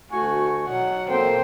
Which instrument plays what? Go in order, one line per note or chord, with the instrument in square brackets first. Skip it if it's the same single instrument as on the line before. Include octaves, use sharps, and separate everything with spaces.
[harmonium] D2 A3 G#5 [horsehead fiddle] F#4 [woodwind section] C#6
[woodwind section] B2 [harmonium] F#3 [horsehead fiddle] F#5
[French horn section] A#3 C4 A4 [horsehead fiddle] C5 G5